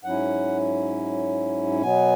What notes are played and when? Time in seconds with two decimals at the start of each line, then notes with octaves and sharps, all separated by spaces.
0.04 G#2 F#3 C#4 E4 F#5
1.81 B2 F#3 B3 G#5